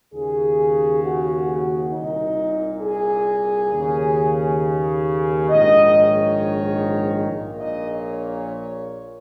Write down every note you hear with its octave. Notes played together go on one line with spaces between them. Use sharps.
D#2 C#3 G#4
F#4
C2 A#2 D#4
G#4
D#2 C#3
A#1 G#2 D#3 D#5
C#5
A#1 A#2
D#5
C#5